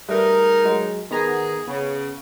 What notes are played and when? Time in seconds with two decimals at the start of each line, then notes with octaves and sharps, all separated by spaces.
0.09 G3 A3 D#4 G#4 A#4 B4
0.65 F#3 G#3
1.11 D#3 B3 G#4 A#5
1.67 C#3 B3